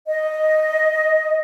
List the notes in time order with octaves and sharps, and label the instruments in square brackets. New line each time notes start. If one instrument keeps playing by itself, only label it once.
[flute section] D#5